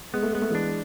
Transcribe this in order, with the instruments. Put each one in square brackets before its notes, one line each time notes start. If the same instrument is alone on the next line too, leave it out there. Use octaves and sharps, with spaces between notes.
[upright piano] G#3 [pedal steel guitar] B3
[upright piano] A3
[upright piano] G#3 [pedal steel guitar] B3
[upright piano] A3
[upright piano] E3 G#3 [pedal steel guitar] D4